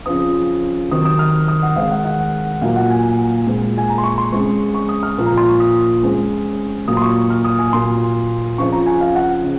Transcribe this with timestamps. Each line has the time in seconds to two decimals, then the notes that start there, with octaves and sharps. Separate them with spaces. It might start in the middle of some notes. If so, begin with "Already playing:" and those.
0.06 C#3 F3 C4 D#6
0.91 C3 D#3 F#3 C4 D#6
1.05 D#6
1.19 F6
1.48 D#6
1.62 F#5
1.76 D#3 G#3 C4 F5
1.90 F#5
2.05 F#5
2.62 A#2 F#3 A#3 F5
2.76 F#5
2.90 G#5
3.47 A#2 G#3 C4
3.78 G#5
3.90 A#5
3.98 C6
4.04 C#6
4.18 C6
4.32 C#3 G#3 C4 C#6
4.75 C#6
4.89 D#6
5.03 F6
5.17 A#2 F3 A#3
5.26 A#5
5.37 C6
5.48 C#6
5.60 D#6
6.03 C#3 G#3 C4
6.88 A#2 F#3 A#3 D#6
6.97 C6
7.02 C#6
7.30 F6
7.45 D#6
7.59 G#5
7.73 A#2 F#3 A#3 C6
8.58 C#3 F3 C4 C#6
8.72 A#5
8.86 G#5
9.01 F5
9.15 F#5
9.43 C#3